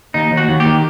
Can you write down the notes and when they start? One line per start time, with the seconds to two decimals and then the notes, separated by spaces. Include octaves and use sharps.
0.14 D#2 D#4
0.31 D#2
0.37 F#4
0.49 D#2
0.60 G4
0.66 D#3